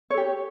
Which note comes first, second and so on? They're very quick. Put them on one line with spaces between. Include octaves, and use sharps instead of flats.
C#5 A4 G4